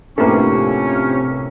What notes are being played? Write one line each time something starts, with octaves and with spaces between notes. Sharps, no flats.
A2 C3 F3 A#3 C#4 D4 A4 B4